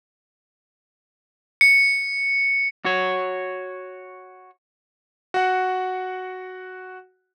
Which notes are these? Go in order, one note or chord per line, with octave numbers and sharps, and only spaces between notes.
C#7
F#4 C#5
F#4 F#5